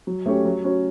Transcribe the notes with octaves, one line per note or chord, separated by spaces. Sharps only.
F#3
A3 C#4 G4 C#5
F#3
C#4 F#4 C#5